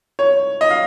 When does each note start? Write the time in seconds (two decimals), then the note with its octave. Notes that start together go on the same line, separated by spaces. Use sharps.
0.19 C#5
0.61 D#5
0.71 F5